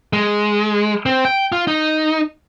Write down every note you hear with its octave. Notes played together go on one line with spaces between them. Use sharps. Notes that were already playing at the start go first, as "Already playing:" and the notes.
G#3
C4
G5
F4
D#4